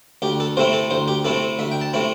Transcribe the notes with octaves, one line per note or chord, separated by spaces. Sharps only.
D2 G4
A4
C3 A3 C4 E4 C5
A4
D2 C5
G4
C3 A3 C4 E4 A4
D2 E5
G5
A5
C3 A3 C4 E4